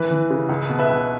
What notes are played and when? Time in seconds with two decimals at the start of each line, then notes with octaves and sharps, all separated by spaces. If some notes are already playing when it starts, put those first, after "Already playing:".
Already playing: E3 B4
0.11 E3
0.30 C#3
0.49 C#2
0.70 B2
0.79 B4 E5
0.90 C#2